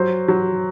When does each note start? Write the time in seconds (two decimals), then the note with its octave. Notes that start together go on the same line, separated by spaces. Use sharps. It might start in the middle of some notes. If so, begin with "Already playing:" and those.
Already playing: F#3 C5
0.28 F#3